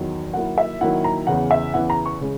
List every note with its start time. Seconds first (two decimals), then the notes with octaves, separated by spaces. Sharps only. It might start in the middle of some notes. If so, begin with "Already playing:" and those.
Already playing: E2 D#3 F#3
0.33 D#3 F#3 A#3 E4 F#5
0.58 E5
0.81 D#3 F#3 A#3 E4 F#5
1.04 A#5
1.27 E2 C#3 E3 F#5
1.51 E5
1.74 E2 C#3 E3 F#5
1.90 A#5
2.06 C#6
2.21 C#3 G#3